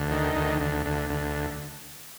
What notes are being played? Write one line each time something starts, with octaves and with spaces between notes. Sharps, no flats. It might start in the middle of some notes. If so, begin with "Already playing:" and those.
Already playing: D2
D#3
D2
D2
D2
D2